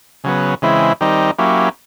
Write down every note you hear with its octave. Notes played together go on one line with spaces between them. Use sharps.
C#3 F#3 B3
C#3 E3 G#3 C4 E4
D#3 G3 C4 D#4
F#3 A#3 C#4 E4 G4